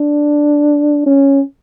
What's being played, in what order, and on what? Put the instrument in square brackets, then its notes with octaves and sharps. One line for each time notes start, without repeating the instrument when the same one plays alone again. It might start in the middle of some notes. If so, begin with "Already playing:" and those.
Already playing: [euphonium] D4
C#4